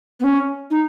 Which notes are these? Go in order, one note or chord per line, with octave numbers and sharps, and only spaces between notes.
B3
C#4
D#4